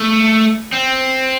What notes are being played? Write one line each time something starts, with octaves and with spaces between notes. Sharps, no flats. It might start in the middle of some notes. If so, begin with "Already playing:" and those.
Already playing: A3
C4